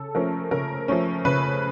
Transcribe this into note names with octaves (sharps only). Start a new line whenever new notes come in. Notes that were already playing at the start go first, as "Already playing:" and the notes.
Already playing: C#3 A4
F3 A3 C#4 A#4
C#3 A#4
F3 A3 C#4
C#3 B4